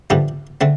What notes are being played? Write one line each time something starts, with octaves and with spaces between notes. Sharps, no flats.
G2 D3 F3 A3 G4
D3 A3 C4